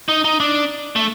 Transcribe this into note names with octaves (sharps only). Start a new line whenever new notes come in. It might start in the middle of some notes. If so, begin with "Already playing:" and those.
D#4
D#4
D4
A3